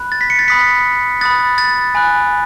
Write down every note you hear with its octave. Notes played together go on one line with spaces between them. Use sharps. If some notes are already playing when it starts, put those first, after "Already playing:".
Already playing: B5 F#6
A6
B6
C#7
A6
B5 D#6 F#6 B6
B5 D#6 F#6 A6
A6
A6
G#5 B5 F#6